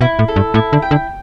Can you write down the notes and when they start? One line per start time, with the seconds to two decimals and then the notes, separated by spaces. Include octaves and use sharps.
0.01 B2 E4
0.19 A2
0.28 A4
0.36 G2
0.54 A2 E4
0.73 D3
0.82 G5
0.91 D3